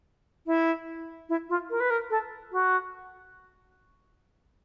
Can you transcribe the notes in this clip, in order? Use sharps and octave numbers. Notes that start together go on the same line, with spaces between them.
E4
E4
F4
A#4
B4
A#4
A4
F#4